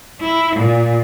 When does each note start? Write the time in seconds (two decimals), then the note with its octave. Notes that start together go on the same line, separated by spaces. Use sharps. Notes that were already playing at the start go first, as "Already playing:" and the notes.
0.21 E4
0.56 A#2